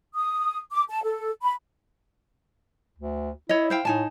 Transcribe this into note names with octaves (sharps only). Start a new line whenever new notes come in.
D#6
D6
A5
A4
B5
D2
E4 C#5 D#5
C5 F5 G5
A2 D#4 G#5 A5